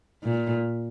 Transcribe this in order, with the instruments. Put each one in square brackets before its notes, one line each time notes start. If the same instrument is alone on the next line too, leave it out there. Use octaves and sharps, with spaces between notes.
[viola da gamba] A#2